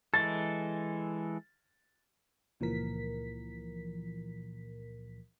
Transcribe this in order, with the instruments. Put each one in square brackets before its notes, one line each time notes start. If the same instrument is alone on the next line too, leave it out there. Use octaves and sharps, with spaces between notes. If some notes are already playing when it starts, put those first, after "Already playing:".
[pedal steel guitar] E3 G#3 A4 [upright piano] A6
[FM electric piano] C#2 A#2 E3 F3 A#4 B6